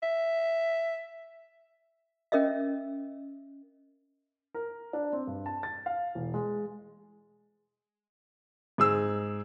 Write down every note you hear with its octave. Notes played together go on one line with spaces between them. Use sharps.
E5
C#4 A#4 D#5 E5
A#4
D4
C4
G2
A5
A6
F5
E1
G#3
G#2 G#4 E6